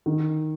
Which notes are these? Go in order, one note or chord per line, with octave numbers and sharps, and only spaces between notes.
D#3